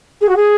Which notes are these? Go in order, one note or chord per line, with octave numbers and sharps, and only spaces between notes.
G#4
F#4
G#4